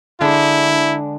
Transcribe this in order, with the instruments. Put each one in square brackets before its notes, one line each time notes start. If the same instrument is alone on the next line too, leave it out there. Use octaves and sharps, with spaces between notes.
[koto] D3 G#3 [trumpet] E4